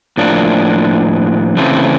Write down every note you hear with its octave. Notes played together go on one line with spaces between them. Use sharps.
A2 F3 A#3 D4
C#3 E3 A3 C4